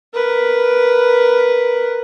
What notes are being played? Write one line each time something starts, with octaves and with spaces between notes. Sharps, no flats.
A#4 B4